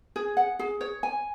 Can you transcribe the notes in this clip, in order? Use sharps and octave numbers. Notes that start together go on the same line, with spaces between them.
G#4
F#5
G#4
C#5
G#5